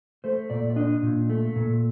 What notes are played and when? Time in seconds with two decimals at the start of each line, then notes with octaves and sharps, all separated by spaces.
0.24 A3 C5
0.50 A#2 D5
0.70 D5
0.76 D4 D#5
1.03 A#2
1.29 A3
1.56 A#2